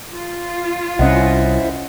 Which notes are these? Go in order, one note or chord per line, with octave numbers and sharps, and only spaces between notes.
F4
C2 C#4 E4 C5 D#5 E5 F#5